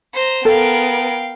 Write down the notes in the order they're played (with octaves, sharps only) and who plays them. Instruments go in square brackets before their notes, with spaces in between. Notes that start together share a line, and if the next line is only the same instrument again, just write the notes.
[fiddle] C5 A#5
[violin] B3 A#4 [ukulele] A4 [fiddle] F5 G5